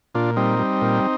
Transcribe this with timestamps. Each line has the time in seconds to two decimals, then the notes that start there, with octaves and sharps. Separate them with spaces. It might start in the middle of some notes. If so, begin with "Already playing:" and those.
0.15 A#2 D4 F4
0.36 G3 C4 D#4
0.59 G3
0.82 A#2